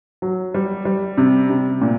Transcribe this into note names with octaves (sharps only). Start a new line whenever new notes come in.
F#3
G3
G3
C3
C3
A#2